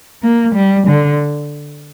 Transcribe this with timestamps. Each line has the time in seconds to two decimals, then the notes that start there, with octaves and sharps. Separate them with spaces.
0.22 A#3
0.54 G3
0.87 D3